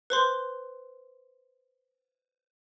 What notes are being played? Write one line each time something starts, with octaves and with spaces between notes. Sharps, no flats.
B4 C5 C6